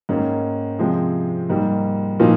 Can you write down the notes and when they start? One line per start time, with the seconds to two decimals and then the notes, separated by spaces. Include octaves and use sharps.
0.09 G#2 D#3 A#3 C#4
0.79 C3 F3 G#3 C4
1.50 G#2 G3 A#3
2.20 A#2 F3 A#3 D#4